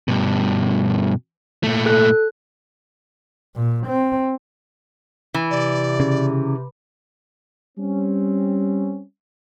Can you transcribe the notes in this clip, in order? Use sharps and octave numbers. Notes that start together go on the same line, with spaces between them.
G2 B2
A#2 A3
A4 F#6
A#2
C4
E3
C3 D5
C#3
G3 C4 C#4